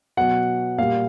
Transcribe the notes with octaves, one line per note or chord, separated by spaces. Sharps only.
B2 F#3 F#5
A#2 G3 F5